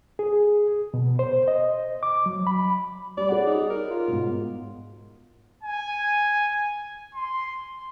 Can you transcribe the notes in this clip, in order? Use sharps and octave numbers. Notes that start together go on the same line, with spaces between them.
G#4
B2
C5
D#5
D6
F#3
B5
G3 D5
G#4 C#5 F#5
D#4
A#4
F4
G#2 B2
G#5
C6